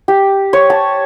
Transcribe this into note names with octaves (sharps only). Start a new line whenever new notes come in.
G4
C#5
A5